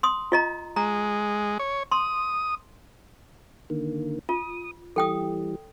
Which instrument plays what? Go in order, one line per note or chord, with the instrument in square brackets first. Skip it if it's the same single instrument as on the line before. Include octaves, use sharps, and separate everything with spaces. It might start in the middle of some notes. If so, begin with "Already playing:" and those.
[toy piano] C6 D#6
F4 D#5 A#5
[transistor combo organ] G#3 [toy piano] A#5
[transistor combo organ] C#5
[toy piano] C6 [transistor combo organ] D#6
[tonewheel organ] D3 D#3 A#3
[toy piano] F4 [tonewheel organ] D#6
[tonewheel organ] E3 G3 [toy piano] A4 G5 D#6